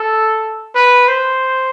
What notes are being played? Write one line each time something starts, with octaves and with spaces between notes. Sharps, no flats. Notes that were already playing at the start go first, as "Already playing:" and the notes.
Already playing: A4
B4
C5